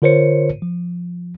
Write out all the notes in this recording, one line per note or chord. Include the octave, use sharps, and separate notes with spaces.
D3 F4 A#4 C5 C#5 C#7
F3